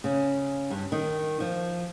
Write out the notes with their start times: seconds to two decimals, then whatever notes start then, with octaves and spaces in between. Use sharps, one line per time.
0.04 C#3
0.70 G2
0.92 D#3
1.40 F3